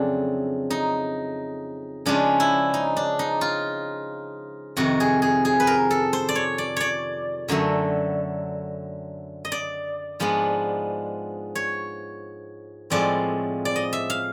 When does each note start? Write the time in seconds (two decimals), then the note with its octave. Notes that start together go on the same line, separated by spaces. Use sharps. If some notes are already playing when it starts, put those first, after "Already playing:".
Already playing: F2 C#3 F#3 A3 C4 D4
0.70 D#4
2.06 C#3 F3 G#3 C#4 D4
2.40 E4
2.74 D#4
2.97 D4
3.19 D#4
3.41 F4
4.77 F2 C3 D#3 F#4
5.00 G#4
5.22 G#4
5.45 G#4
5.60 B4
5.67 A#4
5.91 A4
6.13 C5
6.29 D5
6.35 C#5
6.58 D5
6.76 C#5 D5
7.48 F#2 D3 F#3 A3
9.45 D#5
9.52 D5
10.20 G#2 F3 G#3 B3 D4
11.55 C#5
12.90 A2 F3 G#3 C4 D5
13.65 D5
13.76 D#5
13.93 E5
14.10 F5